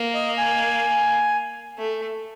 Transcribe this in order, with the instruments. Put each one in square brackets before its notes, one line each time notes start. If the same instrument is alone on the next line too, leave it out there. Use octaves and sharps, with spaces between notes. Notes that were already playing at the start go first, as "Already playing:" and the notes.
Already playing: [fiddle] A#3
[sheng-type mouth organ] D#5
G#5
[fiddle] A3